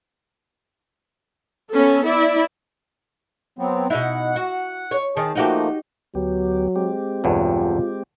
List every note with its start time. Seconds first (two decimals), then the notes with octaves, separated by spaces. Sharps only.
1.71 B3 C#4 A4
2.05 E4 D5
3.59 F#3 B3 C4
3.90 B2 D#4 E4 F#5
4.36 F#4
4.91 C#5
5.17 D#3 G#4 A5
5.35 F3 A3 A#3 D#4 F#4 G4
6.15 D2 F#3 B3 G4
6.76 G#3 C4 G4
7.24 B1 E2 G2 F4